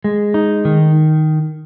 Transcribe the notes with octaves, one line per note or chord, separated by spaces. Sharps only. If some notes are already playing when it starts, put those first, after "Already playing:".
G#3
D#4
D#3